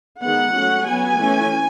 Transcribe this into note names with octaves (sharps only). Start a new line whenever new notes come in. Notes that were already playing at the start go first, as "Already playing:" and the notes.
D#3 G#3 B3 F#5
F#3 A3 C#4
F#3 B3 G#5
E3 A3 C#4